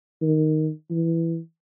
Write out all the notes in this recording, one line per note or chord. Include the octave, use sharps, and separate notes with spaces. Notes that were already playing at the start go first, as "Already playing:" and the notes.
D#3
E3